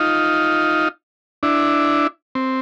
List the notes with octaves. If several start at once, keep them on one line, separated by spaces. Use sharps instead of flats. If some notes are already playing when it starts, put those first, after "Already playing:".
Already playing: D#4 F4
D4 E4
C4